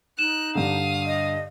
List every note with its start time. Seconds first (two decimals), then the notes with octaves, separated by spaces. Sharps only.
0.19 D#4 F#6 E7
0.55 G2 D3 F5 D#6
1.06 D#5